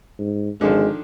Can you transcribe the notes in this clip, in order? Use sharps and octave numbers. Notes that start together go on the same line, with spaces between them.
G#2
G#1 D3 D#3 F3 G#3